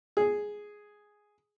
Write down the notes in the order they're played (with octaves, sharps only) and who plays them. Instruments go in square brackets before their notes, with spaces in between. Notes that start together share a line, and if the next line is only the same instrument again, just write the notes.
[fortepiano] G#4